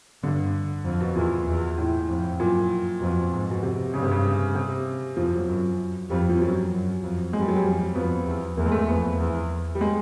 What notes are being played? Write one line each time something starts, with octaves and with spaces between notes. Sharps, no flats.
G2 D3
F2
B2
E2 A#2
E2
A2
F2
F#2 A#2
F2 B2
G#2
B2
C3
G2 C#3
C3
C#3
C3
F2 F3
F#3
F#2
F2 G3
F3
F#2 F#3
F#2
F2
F#2 G#3
G3
F#3
G3
F2
F2 B3
E2
E2 A#3
G#3
A3
F2 B3
E2
G3
G#3